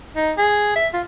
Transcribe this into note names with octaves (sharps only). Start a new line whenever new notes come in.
D#4
G#4
E5
F4